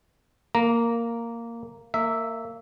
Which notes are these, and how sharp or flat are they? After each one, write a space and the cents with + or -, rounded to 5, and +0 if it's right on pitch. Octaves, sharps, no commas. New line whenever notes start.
A#3 -5 A#5 +0
A#3 -25 E5 +0